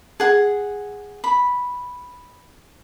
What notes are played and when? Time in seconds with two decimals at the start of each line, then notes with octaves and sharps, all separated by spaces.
0.20 G#4 F#5
1.24 B5